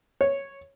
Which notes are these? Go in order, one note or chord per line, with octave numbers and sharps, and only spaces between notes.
C#5